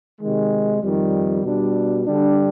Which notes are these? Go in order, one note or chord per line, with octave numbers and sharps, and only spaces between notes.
C3 D#3 G#3
F2 D#3 G3
B2 G3 D4
D3 G3 D4